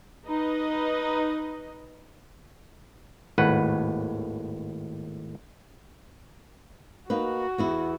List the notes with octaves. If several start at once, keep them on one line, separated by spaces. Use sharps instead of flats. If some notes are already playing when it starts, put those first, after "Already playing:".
D#4 B4 D#5
G#1 D#2 A2 B4 F#5
A#3 D#4 F#4 B4
E2 B3 E4